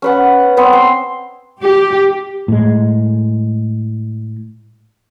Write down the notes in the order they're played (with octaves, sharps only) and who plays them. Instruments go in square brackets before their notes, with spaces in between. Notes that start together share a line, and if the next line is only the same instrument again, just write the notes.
[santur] C#4 B4 F#5
B3 C4 C5 C#5
C6
[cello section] G4
[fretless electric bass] A2 G#3